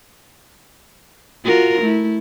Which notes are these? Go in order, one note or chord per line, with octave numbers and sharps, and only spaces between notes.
F4 F#4 A#4
A3 E4